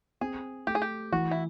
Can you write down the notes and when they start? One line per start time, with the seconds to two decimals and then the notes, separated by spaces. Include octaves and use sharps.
0.21 C4 G#4
0.67 A3 G4
0.75 G#4
0.82 G4
1.12 E3 F#4
1.31 E4